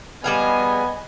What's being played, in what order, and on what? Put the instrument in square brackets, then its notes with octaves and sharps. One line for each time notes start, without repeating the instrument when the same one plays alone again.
[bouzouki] G3 G#4 F5 [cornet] B3 [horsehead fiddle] D#5 G#5